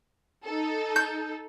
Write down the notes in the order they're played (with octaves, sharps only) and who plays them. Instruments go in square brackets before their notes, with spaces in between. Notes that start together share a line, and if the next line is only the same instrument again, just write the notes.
[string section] D#4 A4
[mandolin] G6